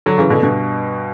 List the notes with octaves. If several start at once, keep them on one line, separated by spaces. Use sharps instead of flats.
D3 F#3
C#3 E3
B2 D3
G2 B2